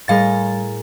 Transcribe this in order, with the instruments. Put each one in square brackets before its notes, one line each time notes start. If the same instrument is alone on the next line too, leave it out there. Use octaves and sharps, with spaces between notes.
[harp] A2 G#4 A#4 [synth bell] G3 F5 A6